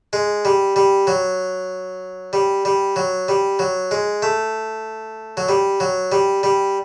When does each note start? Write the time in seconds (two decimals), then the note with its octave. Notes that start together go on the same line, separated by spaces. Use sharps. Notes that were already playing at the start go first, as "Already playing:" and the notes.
0.13 G#3
0.45 G3
0.76 G3
1.07 F#3
2.33 G3
2.65 G3
2.96 F#3
3.28 G3
3.59 F#3
3.91 G#3
4.22 A3
5.37 F#3
5.49 G3
5.80 F#3
6.12 G3
6.43 G3